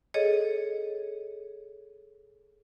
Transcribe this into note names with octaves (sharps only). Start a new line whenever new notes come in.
G#4 A4 C#5 D#5